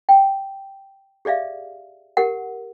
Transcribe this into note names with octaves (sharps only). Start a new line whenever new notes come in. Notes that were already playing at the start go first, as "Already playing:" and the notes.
G5
G4 G#4 D5 E5 F5
G4 A#4 F#5